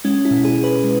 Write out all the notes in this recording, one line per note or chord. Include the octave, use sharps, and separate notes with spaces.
G#3 C#4
E4
B2
G#4
B2
B4
G#3